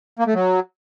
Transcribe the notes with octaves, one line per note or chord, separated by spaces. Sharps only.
A#3
A3
F#3